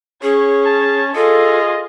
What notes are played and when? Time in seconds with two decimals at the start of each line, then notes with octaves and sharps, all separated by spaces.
0.23 C#4 G#4 C#5
0.66 A5
1.15 F4 G#4 A4 D#5